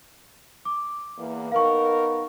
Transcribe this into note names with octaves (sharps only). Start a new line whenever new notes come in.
D6
E2 A#3
B3 D#4 A#4 F5 C#6